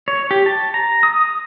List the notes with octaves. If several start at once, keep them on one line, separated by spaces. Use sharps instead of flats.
C#5
G4
A5
A#5
D#6